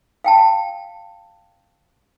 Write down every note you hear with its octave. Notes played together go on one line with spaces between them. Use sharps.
F5 G5 A5